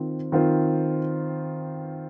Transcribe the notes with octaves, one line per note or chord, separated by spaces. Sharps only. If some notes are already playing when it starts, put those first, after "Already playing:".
Already playing: D#3 C4 F4 C5
D#3 C4 F4 C5